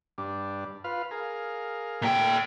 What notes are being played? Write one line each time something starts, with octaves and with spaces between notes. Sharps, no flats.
G2 D4
F4 B4 F5
G#4 A#4 F5
A#2 A3 G5